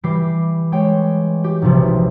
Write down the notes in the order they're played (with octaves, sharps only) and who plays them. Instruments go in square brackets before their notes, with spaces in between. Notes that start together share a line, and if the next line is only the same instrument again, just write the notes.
[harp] E3 G3 G4 C7
G#3 C#5 G5
G4
D#1 B1 C3 F3